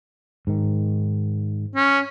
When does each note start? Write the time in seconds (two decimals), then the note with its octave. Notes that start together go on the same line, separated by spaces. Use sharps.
0.47 G#2 D#3
1.75 C#4